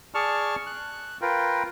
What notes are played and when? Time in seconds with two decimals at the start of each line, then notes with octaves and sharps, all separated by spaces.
0.15 G#4 D5 A5 C#6 F6
0.66 F#6
1.22 F4 A#4 B4 G5